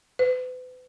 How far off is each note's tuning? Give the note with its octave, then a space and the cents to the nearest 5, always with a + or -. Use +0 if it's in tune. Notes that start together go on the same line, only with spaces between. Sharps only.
B4 +40